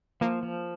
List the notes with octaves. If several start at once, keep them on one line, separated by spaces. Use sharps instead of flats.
F3 A#3
F3